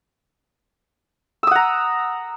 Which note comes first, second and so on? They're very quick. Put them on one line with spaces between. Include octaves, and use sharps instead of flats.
E6 D#6 F#5 A#5